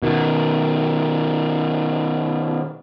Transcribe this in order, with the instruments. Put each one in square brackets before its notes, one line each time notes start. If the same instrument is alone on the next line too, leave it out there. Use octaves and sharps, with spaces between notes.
[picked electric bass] B2 D#3